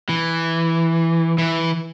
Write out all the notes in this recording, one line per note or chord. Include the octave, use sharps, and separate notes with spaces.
E3
E3